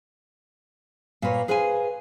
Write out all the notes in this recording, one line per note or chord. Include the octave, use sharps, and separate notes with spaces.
A#2 A#3 B4 C#5
G#4 B4 C5 F5 G5 G#5